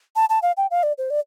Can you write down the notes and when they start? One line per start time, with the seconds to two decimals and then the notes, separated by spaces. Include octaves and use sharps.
0.16 A5
0.30 A5
0.42 F5
0.57 G5
0.71 F5
0.83 D5
0.98 C5
1.10 D5